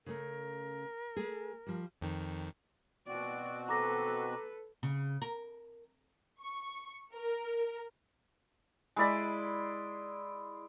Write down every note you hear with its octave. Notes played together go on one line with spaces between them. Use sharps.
C#3 A3 A#4
A3 G#4
F3 G3
F2 D#3
B2 C4 F#4 D5
A4 B4 A#5 D6 A#6
C#3
A#4
C#6
A#4
G#3 E4 D5 B5